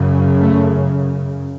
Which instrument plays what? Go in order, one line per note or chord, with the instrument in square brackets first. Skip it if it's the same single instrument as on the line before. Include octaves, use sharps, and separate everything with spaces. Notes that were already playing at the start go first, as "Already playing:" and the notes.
Already playing: [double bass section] F#2 C#3
A3